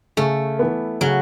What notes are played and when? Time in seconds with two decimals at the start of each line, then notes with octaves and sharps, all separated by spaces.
0.17 C#3 A3
0.59 E3 B3
1.01 C#3 F#3